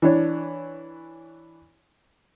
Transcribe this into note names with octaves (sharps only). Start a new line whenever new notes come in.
E3 D4 C#5